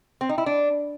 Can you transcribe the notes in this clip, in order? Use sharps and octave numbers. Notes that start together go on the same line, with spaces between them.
C4
D#4
E4
D4